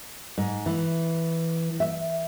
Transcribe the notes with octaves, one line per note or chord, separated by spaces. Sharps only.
G#2
E3
E5